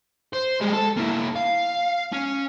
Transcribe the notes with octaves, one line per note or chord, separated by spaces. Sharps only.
C5
G3 G#3
A4
A#3 E4
F5
C#4